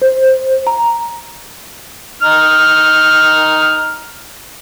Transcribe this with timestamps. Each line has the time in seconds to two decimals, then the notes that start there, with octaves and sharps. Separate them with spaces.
0.02 C5
0.67 A#5
2.22 D#4 F6